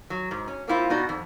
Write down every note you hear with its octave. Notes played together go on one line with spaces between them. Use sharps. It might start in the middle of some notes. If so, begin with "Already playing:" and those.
F#3
G#2
C#4
A#3 C4 E4 F4
B2 B3 D#4 F#4 D5
F2